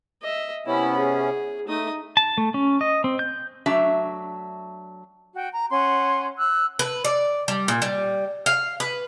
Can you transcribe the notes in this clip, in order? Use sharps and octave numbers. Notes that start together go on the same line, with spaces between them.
D#5 E5
C3 B3 C#4 E4 B5
G#4
A3 D#4 D#6
A5
A3
C#4
D#5
C4
G6
F#3 A3 D4 E5
F#4 G5
A#5
C#4 F#5 C6
E6 F#6
B4
D5
G3
A#2
G3
F5
B4